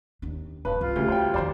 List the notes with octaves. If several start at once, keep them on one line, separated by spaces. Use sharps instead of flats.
D#2 D4
E1 G2 B4
C2 E3 F4
D2 C#3 G3
E3 C5 G5
F2 D#3 C5 D5